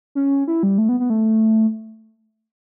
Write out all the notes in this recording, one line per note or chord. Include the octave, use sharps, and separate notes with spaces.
C#4
E4
G3
A3
B3
B3
A3